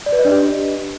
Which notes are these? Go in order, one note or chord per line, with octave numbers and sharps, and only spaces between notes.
D5
B4
D#5
D4
G4